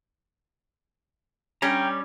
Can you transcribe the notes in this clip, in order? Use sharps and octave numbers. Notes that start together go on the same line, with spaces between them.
G3 C#4 G5 A#5